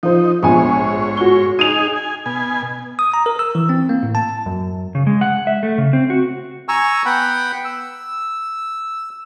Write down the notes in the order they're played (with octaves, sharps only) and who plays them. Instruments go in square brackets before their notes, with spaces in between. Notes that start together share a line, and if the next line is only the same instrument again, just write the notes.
[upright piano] F3 C5 [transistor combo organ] D#4
[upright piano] A#1 B3 G#5 [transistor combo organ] G#2 C#5
[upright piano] F#4 G7
[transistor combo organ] D#4 G#4 [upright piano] D#7 F7
[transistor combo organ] G#5
B2 G#5
[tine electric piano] D#6
A#5
A#4
E6
E3
C4
A#3
A2
A5
[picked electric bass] F#2
[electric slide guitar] C#3
G#3
F#5
E5
A3
C#3
C4
F#4
[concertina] G#5 A#5 C#6 E6
B3 F#5 G5 B5
E6